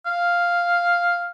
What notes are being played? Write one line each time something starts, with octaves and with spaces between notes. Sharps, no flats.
F5